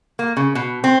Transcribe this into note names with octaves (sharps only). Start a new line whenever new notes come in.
A#3
C#3
B2
C4